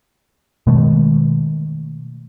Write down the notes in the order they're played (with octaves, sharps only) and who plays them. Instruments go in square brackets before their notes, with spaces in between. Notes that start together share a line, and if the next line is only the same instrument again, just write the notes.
[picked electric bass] B2 D#3 G#3 A3